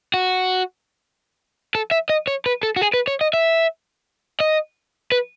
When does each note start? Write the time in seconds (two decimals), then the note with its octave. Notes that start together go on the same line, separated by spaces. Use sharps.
0.14 F#4
1.75 A4
1.91 E5
2.09 D#5
2.27 C#5
2.46 B4
2.63 A4
2.76 F#4
2.81 G#4
2.94 B4
3.08 C#5
3.21 D#5
3.34 E5
4.40 D#5
5.12 B4